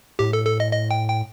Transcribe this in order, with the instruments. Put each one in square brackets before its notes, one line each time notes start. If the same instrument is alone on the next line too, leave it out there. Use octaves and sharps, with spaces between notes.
[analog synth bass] A2 [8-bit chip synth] G4
[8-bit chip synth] A4
A4
D#5
D#5
G5
G5